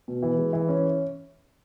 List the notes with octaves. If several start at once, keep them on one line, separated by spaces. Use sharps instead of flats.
B2
E3
G#3
E3
C#4